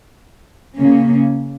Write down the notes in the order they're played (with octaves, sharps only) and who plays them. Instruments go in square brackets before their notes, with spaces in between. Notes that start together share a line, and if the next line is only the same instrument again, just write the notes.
[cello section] C#3 A#3 C#4